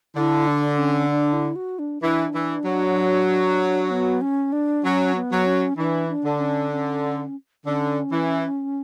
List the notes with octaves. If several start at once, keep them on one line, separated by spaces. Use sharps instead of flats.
D3 E4
D4
C#4
D4
E4
F#4
D4
E3 D4
E3
F#3
B3
C#4
D4
F#3 C#4
B3
F#3
C#4
E3 D4
D4
D3
C#4
C#4
D3 C#4
E3